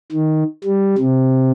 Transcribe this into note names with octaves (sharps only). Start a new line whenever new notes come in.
D#3
G3
C3